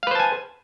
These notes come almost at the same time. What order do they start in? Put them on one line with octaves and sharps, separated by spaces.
F5 B4 C5 A5 G#5